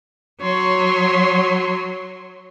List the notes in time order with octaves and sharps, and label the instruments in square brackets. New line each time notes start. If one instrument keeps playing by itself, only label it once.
[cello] F#3 [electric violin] C#5 C6